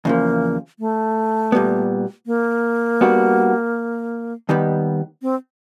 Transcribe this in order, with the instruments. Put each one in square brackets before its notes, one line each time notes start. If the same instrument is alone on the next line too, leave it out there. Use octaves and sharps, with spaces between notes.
[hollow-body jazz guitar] E2 C#3 F3 [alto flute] A#3
[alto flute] A3
[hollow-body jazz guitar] A#2 G3 B3
[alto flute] A#3
[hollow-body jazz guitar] G3 B3 D4 F#4
D#2 D#3 G3 B3
[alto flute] C4